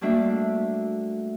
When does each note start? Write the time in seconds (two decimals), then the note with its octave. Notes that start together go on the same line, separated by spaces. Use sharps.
0.01 G3 A3 A#3 D4 F#4 E5